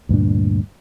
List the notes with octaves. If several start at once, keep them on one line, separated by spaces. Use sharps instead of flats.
D2 G2 A#2 D4